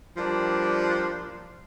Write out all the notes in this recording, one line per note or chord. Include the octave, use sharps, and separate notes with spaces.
F3 G3 A#3 D4